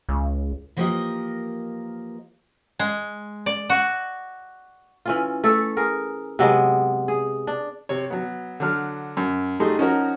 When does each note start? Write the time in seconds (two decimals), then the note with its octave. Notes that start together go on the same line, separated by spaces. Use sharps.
0.09 C#2
0.77 E3 F3 A#3 G4 A#4 D#5
2.79 G#3
3.46 D5
3.70 F#4
5.06 E3 C#4 F4
5.44 A3 A4 C#5 E5
5.77 G#4 A#4
6.39 C3 F#3 G#3 B3
7.08 G#4
7.47 D4
7.89 C3 C#5
8.10 F#3 B3
8.60 D3 F#3 F6
9.17 F#2
9.60 F#3 G3 A3 D#4 G#4 C6
9.78 F3 C#4 D#4 F#4 A#4